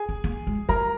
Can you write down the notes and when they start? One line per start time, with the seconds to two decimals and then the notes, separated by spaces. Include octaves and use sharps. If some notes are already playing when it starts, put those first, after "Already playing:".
Already playing: G#4 G#5
0.09 C4
0.24 A#3
0.47 G#3
0.69 G3 A#4 A#5